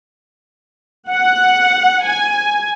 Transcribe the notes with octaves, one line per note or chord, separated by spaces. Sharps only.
F#5
G#5